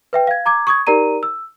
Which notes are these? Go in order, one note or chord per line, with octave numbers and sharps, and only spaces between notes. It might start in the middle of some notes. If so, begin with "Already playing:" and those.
B4 E5 G5
F5 G#6
A#5 D6 G#6
C#6 D#6 G#6
D#4 G4 A#4 D5 A#5 D#7
E6